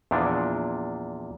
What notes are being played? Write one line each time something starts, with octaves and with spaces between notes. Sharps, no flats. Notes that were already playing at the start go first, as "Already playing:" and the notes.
E2 A#2 E3 F3 D4